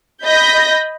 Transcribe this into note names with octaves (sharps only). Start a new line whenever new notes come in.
D#5 B5 G6 A#6